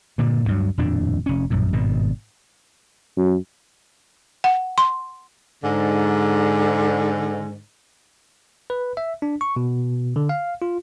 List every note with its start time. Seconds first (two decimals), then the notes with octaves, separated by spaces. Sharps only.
0.18 G2 A#2 D3
0.46 D2 G2 F#3
0.78 D#1 F2 A2 D4
1.26 F1 C#4
1.50 A#1 F#2 A2
1.72 G#1 G2 B2
3.17 F#2
4.44 F#5
4.78 C6
5.63 G#2 D3
8.70 B4
8.97 E5
9.22 D4
9.41 C#6
9.56 B2
10.16 D3
10.29 F5
10.62 F4